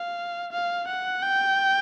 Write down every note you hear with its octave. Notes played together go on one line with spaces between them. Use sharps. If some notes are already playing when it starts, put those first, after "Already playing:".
Already playing: F5
F5
F#5
G5